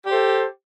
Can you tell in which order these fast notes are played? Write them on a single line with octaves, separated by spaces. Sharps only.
G4 C5 A4